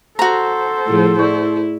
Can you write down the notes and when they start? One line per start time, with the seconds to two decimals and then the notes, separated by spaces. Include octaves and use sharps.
0.19 F#4 A4 C5 A#5
0.87 A2 F3 E4 G#4
1.19 E4 D5 C#6 G6